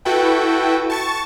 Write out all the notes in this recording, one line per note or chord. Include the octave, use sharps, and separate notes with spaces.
E4 F#4 A4 B4 G5
A5 C#6 A6